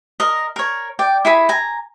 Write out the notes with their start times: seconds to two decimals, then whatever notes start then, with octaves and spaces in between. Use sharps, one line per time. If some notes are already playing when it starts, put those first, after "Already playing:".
0.20 A#4 D#5
0.56 A#4 C#5
0.99 D5 G5
1.25 E4 G#4 B5
1.49 G#5 A#5